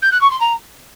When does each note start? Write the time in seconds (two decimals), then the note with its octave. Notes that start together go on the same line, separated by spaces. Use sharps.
0.02 G6
0.11 F#6
0.21 C#6
0.30 C6
0.40 A#5